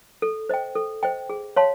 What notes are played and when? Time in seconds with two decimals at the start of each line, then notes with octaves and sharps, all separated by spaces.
0.22 A4
0.49 C5 D#5 G5
0.75 A4
1.03 C5 D#5 G5
1.30 G#4
1.56 C#5 F5 A5 C6